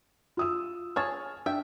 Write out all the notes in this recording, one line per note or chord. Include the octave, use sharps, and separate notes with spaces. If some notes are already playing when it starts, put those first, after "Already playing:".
F4 D#6 E6
G#4 C#5 A5 F6
D4 E5 G5